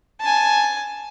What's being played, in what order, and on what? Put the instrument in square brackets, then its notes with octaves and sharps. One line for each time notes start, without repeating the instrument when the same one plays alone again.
[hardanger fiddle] G#5 A5